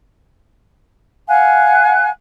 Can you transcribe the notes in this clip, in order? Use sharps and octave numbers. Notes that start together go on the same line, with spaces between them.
F5 F#5 G#5 F#6